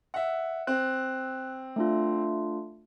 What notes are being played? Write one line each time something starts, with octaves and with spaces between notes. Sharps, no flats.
E5 F#5
C4 F#6
A3 D4 F4